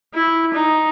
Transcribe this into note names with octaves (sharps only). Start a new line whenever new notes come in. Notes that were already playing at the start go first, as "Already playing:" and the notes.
E4
D#4